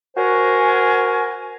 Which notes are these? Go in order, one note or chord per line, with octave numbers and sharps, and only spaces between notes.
F#4 A#4 C5 G#5